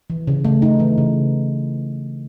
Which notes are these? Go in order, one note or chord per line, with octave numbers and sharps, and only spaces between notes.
E3
C#3
A3
D#4
E3
C#3